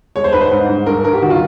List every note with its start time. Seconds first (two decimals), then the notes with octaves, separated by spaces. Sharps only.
0.16 G#3 C#5
0.24 C5
0.33 G#2 B4
0.41 C5
0.52 G#2
0.69 G#2
0.86 G2 A#4
1.04 G2 A#4
1.13 G4
1.22 D#3 F#4
1.30 F4